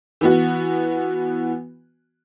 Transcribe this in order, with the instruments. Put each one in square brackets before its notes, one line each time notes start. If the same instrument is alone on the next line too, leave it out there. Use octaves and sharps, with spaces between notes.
[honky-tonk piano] E3 B3 F#4